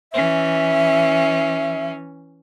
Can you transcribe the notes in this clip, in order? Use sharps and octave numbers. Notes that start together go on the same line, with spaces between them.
E3 C#4 E5